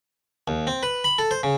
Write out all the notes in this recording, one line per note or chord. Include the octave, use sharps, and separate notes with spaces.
D#2
C4
B4
B5
A4
C5
C#3